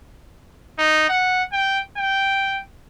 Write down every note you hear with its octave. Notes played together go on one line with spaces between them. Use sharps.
D#4
F#5
G5
G5